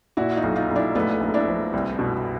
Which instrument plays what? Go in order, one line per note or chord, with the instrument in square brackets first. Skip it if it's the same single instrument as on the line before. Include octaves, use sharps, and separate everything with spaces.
[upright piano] A#2 [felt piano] E4 F#4
[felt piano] D#4 F4
[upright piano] B1
[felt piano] D#4 F4
[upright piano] B1
[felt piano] D4 E4
[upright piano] A#1 [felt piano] A3 B3
[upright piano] A#1
[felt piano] D4 E4
[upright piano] F3
C2
B2